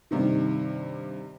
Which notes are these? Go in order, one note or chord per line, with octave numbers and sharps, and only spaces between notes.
G2 C3 D#3